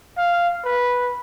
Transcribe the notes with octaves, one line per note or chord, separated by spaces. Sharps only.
F5
B4